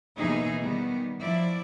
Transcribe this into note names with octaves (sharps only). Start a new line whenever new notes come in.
D#2 B2 E3 D#4 G#4
D#3 G3 B3
F3 F#3 E4 D5